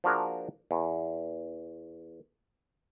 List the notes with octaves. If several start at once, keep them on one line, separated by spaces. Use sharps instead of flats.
F3 A#3 D4 F#4 G#4 A#4
E2